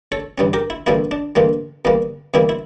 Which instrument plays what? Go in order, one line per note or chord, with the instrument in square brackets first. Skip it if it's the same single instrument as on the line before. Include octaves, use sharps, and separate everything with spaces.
[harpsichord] A4 C#5
G2 E3 G3 C#4
G4 A#4
E4
A#1 A2 E3 G3 A#3 E4
D4
A#1 A2 E3 G3 A#3
E2 E3 G3 A#3
E2 E3 G3 A#3 E4
E4